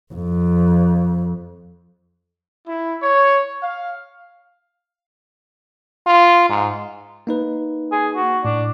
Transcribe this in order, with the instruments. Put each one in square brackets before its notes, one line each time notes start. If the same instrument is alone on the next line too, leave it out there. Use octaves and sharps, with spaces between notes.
[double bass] F2
[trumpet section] E4
C#5
F5
[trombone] F4
G#2
[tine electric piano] A#3 D#4 B4
[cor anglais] G#4
F#4
[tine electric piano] A2 [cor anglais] D4